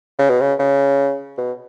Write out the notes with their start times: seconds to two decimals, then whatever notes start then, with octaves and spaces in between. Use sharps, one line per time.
0.19 C#3
0.29 B2
0.41 C#3
0.59 C#3
1.37 B2